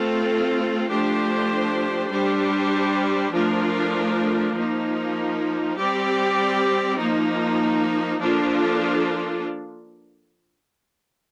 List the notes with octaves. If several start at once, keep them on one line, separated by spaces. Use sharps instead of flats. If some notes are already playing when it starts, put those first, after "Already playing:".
Already playing: A3 C4 F4 A4
F3 A3 D4 G4 C5
G3 D4 G4 C5
F3 A3 D4 F4 A#4
F3 A#3 D#4
G3 C4 G4 D5
F3 A#3 D#4
F3 A#3 D4 F4 A4